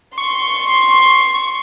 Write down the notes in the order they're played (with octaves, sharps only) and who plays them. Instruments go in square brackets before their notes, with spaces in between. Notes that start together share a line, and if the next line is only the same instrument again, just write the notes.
[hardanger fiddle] C6 [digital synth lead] C#6